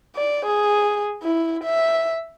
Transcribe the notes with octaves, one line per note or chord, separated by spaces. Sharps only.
D5
G#4
E4
E5